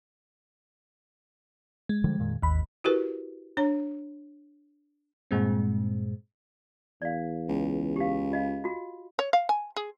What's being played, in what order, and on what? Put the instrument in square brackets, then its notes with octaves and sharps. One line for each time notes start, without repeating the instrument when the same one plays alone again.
[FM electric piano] G#3
[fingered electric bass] D3 F3 G3
F2 A#2 D#3
[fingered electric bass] G#1 [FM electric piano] D#2 B5
[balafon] E4 F#4 G4 A#4 B4
D4 C#5 A#5
[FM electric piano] G2 A#2 G#3 C4
[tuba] E2 [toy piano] D5 F5
[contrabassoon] C#2
[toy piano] G4 F5
F4 D#5 F5
F4 F#4
[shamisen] C#5
F5
G#5
G#4